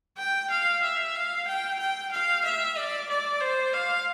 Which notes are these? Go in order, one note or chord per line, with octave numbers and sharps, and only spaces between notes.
G5
F5
E5
F5
G5
G5
F5
E5
D5
D5
C5
F5